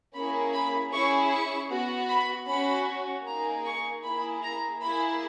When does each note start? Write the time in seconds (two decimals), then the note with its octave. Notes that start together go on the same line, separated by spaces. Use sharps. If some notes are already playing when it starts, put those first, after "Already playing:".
0.14 A#3 C#4 E4 G#4 B5
0.53 B5
0.92 C#4 E4 G#4 C#6
1.31 C#6
1.71 B3 F#4
2.09 B5
2.47 C#4 F#4 B5
3.26 A#3 D#4 G#4 A#5
3.65 C#6
4.04 A#3 E4 G#4 B5
4.42 A#5
4.82 A#3 E4 G#4 B5